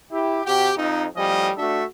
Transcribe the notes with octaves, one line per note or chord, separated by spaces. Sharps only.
E4 G4
C3 F#4 G4
F2 D#4
A2 F3 G3 C#4 D#5
A3 D4 F#4 A4 E5